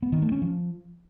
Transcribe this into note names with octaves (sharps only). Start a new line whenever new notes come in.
B3
D#3
A3
C#4
F3